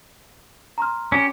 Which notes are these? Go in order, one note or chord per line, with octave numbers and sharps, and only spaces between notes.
A#5 C6 F6
C#4 G4